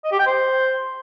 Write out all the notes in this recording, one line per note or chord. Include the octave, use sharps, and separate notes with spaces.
D#5
G4
G5
C5